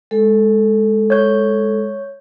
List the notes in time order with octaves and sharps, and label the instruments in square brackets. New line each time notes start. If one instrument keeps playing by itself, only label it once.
[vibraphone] G#3 A4
[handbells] C#5 G6